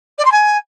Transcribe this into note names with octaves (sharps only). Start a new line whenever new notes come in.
D5
C6
G#5